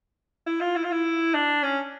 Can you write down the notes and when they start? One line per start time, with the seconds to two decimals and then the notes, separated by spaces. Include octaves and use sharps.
0.46 E4
0.61 F4
0.76 E4
0.84 F4
0.92 E4
1.34 D4
1.63 C#4